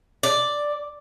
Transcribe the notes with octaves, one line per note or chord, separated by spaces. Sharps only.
D5